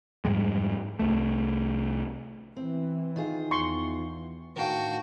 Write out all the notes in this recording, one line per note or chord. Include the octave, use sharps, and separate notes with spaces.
F2 G#2 G3 G#3
C2 A3
E3 C4
D#3 F4 G#4
E2 C6 C#6
A2 D#3 D4 F#4 F5 G5